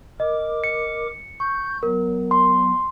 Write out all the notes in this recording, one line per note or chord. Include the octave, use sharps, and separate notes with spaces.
A#4 D#5 D6
C#7
C#6 G6
F#3 B3 A#4
C6